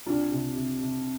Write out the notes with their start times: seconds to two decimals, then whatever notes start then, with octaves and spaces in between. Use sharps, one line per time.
0.06 C2 D4 F4
0.31 C3
0.55 C3
0.81 C3